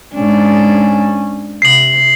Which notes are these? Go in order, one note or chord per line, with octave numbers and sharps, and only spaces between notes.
G#2 C#4 D4
C3 C7 F#7